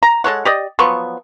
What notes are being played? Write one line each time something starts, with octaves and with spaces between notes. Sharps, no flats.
A#5
G#3 A4 C#5 F#5
G4 D5 D#5
F3 F#3 B3 C#6